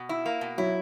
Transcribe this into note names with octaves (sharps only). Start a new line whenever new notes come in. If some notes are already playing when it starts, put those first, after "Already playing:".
Already playing: B2
E4
A#3
B2
F#3 E4